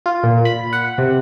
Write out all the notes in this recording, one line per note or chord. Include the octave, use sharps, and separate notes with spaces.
F4
A#2
B5
F#5
C3